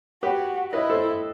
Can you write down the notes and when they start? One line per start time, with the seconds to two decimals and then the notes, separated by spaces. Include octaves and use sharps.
0.23 F#4 G4 B4
0.73 E4 B4 D#5
0.90 A4 C5